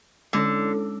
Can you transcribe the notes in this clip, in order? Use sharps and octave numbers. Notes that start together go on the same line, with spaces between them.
D3 G#3 C#4 E4 A4 C#5